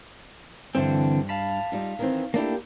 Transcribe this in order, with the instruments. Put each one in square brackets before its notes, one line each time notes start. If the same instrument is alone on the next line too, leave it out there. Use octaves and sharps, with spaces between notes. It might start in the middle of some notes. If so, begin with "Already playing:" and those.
[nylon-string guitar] G2 C5 [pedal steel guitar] D3 E3 C4
[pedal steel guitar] F5 A5 B5
[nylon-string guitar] G3 D#4 F4
D#3 E3 C4
[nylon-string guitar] A3 D4 E4 [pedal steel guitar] A#3 G4